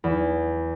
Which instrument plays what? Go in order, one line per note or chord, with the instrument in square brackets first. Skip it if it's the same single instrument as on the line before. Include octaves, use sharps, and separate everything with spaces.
[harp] E2